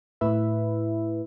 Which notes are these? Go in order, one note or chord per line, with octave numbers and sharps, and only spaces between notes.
A2 E4 B4 E5